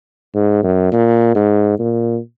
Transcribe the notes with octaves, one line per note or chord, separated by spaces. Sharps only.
G#2
F#2
A#2
G#2
A#2